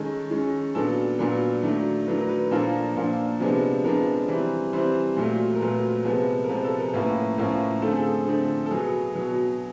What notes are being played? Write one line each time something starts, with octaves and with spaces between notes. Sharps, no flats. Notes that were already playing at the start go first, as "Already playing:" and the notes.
Already playing: D#3 G#3 C#4 A4
D#3 G#3 C#4
A#2 F#3 B3 D4 A4
A#2 F#3 B3 D4 A#4
D#3 F#3 A3 D4
D#3 F#3 A3 D4 B4
A#4
B4
A#2 F3 A#3 D4 A4
A#2 F3 A#3 D4
C3 F3 G#3 B3 D4
C3 F3 G#3 B3 D4 A#4
E3 G3 C4
E3 G3 C4 C5
A#2 F#3 A3
A#4
A#2 F#3 A3 B4
C3 F3 G#3 B3
A#4
C3 F3 G#3 B3 B4
A4
A#4
A2 F3 A#3 C#4 B4
A2 F3 A#3 C#4
D3 F3 A3 C4 A4
G#4
A4
D3 F3 A3 C4
A4
B2 F#3 B3 G#4
B2 F#3 B3